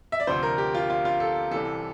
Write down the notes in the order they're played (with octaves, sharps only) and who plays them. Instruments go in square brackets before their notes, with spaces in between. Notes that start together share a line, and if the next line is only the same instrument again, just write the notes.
[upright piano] E5
D5
D2 C3 F3 C5
A#4
G4
F4
F4
F4
A4
C2 C3 E3 A4